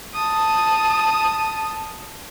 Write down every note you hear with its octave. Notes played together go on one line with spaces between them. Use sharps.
A5 D#6